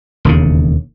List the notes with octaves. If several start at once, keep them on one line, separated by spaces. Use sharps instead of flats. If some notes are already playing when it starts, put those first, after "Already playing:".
E1 D#2 C#3